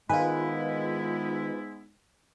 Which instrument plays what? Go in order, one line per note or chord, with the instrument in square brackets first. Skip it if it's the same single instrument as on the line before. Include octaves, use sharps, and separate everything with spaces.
[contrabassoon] G#2 [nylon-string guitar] D#3 G#5 [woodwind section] G#3 B3 E4 [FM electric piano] F4 B4